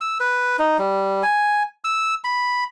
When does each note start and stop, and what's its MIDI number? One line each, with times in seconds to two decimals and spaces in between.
0.01 0.18 88
0.20 0.57 71
0.59 0.77 63
0.79 1.23 55
1.23 1.63 80
1.84 2.15 88
2.24 2.64 83